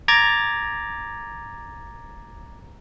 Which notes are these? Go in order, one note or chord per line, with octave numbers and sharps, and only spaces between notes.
A#5 D6 G#6 A6